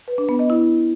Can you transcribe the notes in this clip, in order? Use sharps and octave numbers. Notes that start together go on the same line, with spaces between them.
B4
D4
B3
D#5
E4